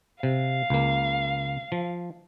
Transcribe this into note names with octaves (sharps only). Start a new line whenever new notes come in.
C3 F5
C#2 A#3
F3